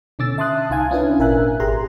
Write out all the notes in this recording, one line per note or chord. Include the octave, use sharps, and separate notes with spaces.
B2 D3 C#4 D6 E6 A6
E5 A5 C6 D#6 F#6
C2 D#4 F5 G#5 G#6
C#4 D4 E4 F4 B4 G#5
G#1 A#2 A#4 E5 G#5 F#6
G#1 G4 G#4 A#5 C6